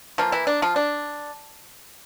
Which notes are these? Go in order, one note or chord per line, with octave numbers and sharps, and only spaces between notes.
E3 F3 A#3 F4
E3 E4
D4
F3 F4
D4